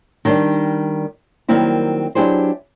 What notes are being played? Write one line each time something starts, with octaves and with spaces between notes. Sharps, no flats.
D#3 G3 D4 D#4
D#3 F#3 G3 A#3 C4 E4
F#3 D4 E4 G4 G#4 C5